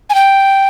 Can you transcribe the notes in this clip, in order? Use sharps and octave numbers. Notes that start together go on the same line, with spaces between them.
G#5
G5